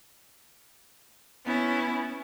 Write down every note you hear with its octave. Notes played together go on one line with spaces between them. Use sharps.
B3 C#4 E4